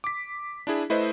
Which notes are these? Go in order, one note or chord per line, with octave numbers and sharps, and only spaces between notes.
D6 B6
D4 E4 G#4
A3 E4 B4 C5 D#5